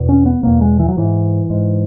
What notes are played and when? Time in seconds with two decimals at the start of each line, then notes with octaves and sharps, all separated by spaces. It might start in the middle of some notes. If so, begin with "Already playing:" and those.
Already playing: E2 B2
0.09 C#4
0.26 B3
0.43 E2 B2 A#3
0.61 G#3
0.79 E3
0.88 F#3
0.97 G#2 E3
1.50 G#2